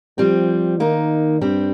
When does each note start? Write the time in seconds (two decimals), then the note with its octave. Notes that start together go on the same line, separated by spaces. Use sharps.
0.18 F3 G3 C4
0.80 D#3 A#3 D#4
1.41 G2 G3 C4